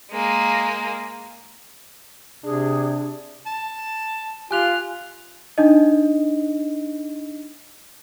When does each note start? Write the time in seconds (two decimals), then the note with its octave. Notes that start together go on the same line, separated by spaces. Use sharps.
0.11 G#3 A#3
2.44 C3 D4 G#4
3.46 A5
4.51 F4 G4 G#5 F#6 F7
5.58 D4 D#4 D#5